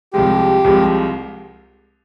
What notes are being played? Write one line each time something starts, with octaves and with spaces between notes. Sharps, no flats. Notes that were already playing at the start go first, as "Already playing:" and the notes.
C2 C3 F3 G#3 G4
C2 C3 F3 G#3